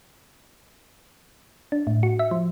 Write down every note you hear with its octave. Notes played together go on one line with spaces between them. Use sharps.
D4
A2
F#4
E5
F3